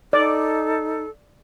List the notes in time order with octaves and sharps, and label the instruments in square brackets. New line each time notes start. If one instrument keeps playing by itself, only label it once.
[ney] D#4 [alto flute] A4 [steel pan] D5